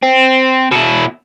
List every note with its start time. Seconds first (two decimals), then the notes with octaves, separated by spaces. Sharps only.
0.02 C4
0.72 B2 E4